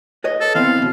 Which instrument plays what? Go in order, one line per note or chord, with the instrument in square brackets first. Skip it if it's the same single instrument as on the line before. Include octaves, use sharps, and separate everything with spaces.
[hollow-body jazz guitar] B4 C#5 D#5
[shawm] A4
[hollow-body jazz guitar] E3 B3 C4 [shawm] F5
[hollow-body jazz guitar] E2 B2